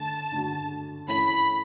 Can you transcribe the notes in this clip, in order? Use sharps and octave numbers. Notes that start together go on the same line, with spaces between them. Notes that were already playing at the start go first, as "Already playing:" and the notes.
Already playing: D3 A3 D4 A5
D3 A3 D4 F#4
E3 A3 C#4 E4 A4 B5